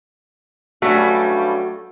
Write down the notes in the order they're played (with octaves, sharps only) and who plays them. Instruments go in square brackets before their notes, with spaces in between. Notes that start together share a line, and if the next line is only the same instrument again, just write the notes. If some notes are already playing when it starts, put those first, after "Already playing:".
[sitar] G2 G3 C#4 [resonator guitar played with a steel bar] F#3 A3 F#4